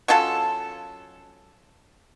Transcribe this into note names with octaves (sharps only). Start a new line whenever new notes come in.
F#3 C#4 F4 A4